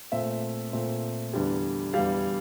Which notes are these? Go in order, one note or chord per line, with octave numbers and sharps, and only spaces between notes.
A#2 A3 C4 E5
A#2 A3 C4
E2 D3 G3
E2 D3 G3 F5